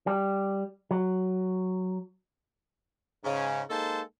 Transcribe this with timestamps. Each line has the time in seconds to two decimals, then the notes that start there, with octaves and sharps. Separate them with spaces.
0.07 G3
0.91 F#3
3.24 G#2 C#3 C#4
3.70 G#3 A#3 D#4 A4 C5 A5